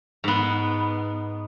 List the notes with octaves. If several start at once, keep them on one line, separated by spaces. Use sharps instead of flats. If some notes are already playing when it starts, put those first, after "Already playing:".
G#2 B3